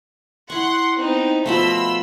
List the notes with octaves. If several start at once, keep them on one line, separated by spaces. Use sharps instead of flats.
E4 F#5 C6 C#6
B3 C4 D#4
B2 F3 A3 B5 C6 E6